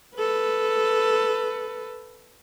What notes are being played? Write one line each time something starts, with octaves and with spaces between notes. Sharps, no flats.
A4 B4